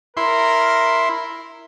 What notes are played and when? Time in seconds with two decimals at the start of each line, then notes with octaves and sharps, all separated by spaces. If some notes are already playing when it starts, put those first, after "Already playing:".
0.17 E4 A#4 C6